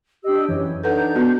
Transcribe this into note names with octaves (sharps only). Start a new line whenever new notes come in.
D4 G4 D#5 E6
F#2 E3 C#5
D4 D#4 A4 B4 F#5 A#5 G6
B3 F#4